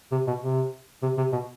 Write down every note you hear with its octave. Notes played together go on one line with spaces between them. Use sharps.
C3
B2
C3
C3
C3
B2